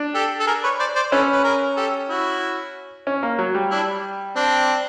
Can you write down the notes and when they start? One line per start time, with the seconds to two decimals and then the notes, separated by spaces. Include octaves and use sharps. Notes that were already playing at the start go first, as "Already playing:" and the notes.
Already playing: D4
0.14 G4 A4
0.40 A4
0.47 G#4 A#4
0.64 B4 C#5
0.80 C5 D5
0.96 C5 D5
1.12 C#4 A4 B4
1.32 B4
1.44 G#4 A#4
1.77 G4 A4
2.09 E4 F#4
3.07 C#4
3.23 A#3
3.39 F#3
3.55 G3
3.71 D4 E4
4.36 C4 D4